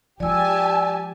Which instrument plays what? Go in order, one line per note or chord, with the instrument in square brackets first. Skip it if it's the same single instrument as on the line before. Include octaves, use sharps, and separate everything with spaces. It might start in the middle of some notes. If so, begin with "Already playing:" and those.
[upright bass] F3 G#3 [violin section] G4 G#5 A5 [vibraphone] D5 E6